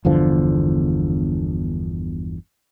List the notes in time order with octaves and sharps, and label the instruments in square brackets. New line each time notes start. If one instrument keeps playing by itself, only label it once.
[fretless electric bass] G1 E2 D3 F3